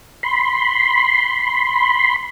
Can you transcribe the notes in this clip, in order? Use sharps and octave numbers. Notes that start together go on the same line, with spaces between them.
B5 C6